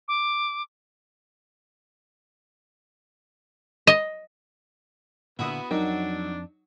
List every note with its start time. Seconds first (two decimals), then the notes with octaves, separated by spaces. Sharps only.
0.08 D6
3.87 D#5
5.39 A#2 D3 B3 E4 F#4 E5 D#6
5.71 F2 F#3 D4 D#4 A#4 G5